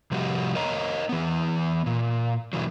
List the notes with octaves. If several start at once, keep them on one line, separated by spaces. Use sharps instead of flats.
C3 F3 G3 F#4 G4
A#4 C#5 D#5 A#5
E3 B3
A#2
B2 E3 F#3